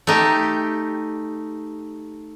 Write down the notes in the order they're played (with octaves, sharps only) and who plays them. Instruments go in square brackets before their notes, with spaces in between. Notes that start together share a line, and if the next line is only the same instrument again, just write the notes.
[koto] A3 D#4 G4